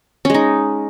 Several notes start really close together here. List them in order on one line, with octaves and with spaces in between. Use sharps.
C#4 G#3 D#4